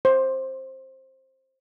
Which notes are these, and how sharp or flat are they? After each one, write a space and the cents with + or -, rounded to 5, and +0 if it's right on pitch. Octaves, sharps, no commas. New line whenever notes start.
C5 +15